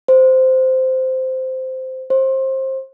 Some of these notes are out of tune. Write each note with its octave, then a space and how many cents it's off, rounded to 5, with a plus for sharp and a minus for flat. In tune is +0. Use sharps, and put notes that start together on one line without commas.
C5 -10
C5 +25